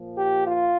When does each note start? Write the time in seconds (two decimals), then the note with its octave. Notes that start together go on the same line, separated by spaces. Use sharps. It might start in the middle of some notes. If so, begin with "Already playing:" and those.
Already playing: A#2 F3
0.16 G4
0.46 F4